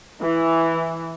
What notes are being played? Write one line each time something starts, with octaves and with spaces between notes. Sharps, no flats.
E3